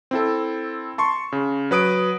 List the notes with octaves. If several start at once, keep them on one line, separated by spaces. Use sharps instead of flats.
C4 E4 A4
A5 C6 C#6
C#3
F#3 B4 D#6 D7